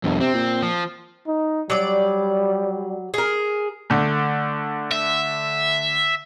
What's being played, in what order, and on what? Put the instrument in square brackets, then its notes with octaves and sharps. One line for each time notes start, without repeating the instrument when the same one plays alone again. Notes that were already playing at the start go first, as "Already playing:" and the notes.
[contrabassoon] G1 [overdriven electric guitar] C2 F2
[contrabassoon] C3 [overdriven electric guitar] C4
[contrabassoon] A#2
[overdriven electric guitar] F3
[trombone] D#4
[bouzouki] F#3 D5 [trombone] G3
[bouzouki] G#4 A#4
[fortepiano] D3 A3
[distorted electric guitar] E5